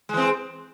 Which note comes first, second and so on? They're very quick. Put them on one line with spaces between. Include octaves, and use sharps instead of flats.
G#3 E3 C4